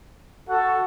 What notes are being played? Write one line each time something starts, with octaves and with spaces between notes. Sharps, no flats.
F#4 A4 F#5